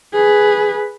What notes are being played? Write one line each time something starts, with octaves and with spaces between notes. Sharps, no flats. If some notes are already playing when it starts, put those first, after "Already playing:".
G#4 B4